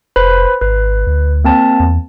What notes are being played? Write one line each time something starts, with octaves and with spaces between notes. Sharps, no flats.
F1 B4 C5 B5
G#1 B4
D2
A#3 C4 A5
E2